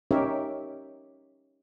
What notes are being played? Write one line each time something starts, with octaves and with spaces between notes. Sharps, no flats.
C#4 D#4 G4 A#4 C#5 E5